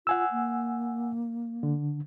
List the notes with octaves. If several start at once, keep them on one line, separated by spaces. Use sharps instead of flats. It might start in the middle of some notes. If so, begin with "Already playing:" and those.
F4 F#5 G#5 E6
A#3
D3